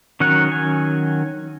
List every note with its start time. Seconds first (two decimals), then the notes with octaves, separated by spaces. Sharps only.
0.20 D#3 F#3 C#4 F#5
0.52 G#5